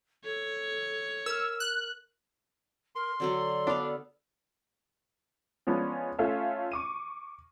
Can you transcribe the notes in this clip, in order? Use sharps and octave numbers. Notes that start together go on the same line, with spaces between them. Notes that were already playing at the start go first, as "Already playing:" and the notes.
A4 C#5
A#4 E6 F6
F#6
A#4 C6
D3 F#3 D4 A4
B3 D4 F5
F3 G#3 B3 C#4 D4
A3 C#4 F4 A4 E5
C#6 D6 D#7